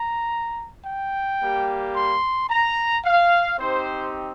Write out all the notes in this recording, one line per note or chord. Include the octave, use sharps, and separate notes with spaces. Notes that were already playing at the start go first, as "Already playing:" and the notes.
Already playing: A#5
G5
G3 A#3 G4
C6
A#5
F5
C4 D#4 G4 C5